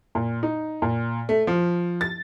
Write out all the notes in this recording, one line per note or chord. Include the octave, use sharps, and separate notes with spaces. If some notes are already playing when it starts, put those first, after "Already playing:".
A#2
D#4
A#2
A3
F3
A6